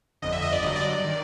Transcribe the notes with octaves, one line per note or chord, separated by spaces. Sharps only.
G1 F2 D3 D#5
E5
D#5
D5
G2 D3 F#3 D#5
D5
D5
D#3